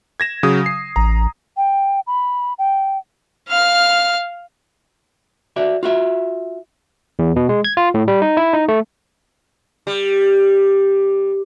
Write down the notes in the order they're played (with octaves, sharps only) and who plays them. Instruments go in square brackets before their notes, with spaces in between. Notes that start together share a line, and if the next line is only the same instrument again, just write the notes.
[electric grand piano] G#6 A#6 E7
C#3 F#3 D#6
C7
[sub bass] A1 [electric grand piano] A#5
[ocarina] G5
B5
G5
[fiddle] F5 F6
[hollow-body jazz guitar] F#4 D5 E5
F4 F#4 E5
[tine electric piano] E2
B2
G#3
G#6
F4
A2
G3
D#4
E4
D#4
A3
[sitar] G3